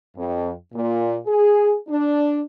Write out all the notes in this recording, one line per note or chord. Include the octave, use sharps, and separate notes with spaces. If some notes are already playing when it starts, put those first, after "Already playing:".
F2
A#2
G#4
D4